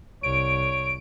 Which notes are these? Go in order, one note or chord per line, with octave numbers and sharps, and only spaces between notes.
C2 C#5 D7